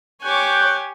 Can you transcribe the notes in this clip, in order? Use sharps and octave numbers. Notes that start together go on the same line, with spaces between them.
G4 C#5 G#5 C#6 D6 F#6 G6